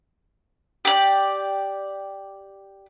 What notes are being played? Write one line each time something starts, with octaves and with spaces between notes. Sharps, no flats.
G4 D5